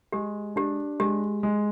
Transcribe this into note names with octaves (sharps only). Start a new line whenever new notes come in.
G#3 G4
D4 G4
G#3 G4
G#3